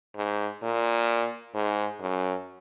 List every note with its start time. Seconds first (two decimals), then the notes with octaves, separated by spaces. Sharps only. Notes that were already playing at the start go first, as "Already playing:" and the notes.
0.16 G#2
0.63 A#2
1.55 G#2
2.01 F#2